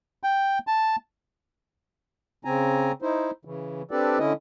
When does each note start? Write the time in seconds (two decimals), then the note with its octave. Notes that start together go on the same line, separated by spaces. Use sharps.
0.23 G5
0.67 A5
2.45 C#3 C4 G#5 A#5
3.02 D#4 E4 C5
3.45 C#3 E3
3.91 C4 D4 G4 A4 B4 D5
4.19 D3 C#4 E4 D#5